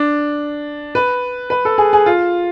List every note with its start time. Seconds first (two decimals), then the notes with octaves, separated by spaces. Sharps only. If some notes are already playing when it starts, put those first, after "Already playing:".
Already playing: D4
0.95 B4
1.50 B4
1.65 A4
1.78 G#4
1.93 G#4
2.06 F4